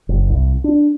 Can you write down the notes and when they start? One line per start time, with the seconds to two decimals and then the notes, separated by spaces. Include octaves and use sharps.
0.09 F#1
0.30 C2
0.64 D4